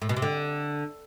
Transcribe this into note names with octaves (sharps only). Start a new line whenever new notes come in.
A2
B2
C3
D3